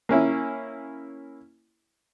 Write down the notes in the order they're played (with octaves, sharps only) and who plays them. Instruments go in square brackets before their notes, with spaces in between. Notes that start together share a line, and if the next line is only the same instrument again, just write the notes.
[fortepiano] A#3 C#4 E4